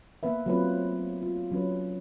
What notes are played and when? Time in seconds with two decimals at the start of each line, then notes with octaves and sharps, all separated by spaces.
0.23 A#3 B3 A#4 B4 E5
0.46 F#3 A3 B3 C4 F4 B4
1.23 F4
1.52 F#3 C#4 B4